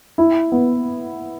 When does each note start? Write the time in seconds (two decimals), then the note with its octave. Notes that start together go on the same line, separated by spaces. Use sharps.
0.18 E4
0.52 B3